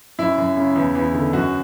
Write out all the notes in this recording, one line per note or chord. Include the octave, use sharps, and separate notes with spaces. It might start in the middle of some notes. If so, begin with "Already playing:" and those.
F#2 E4
F#2
C#3
E2
E2
D3
F#2 F#4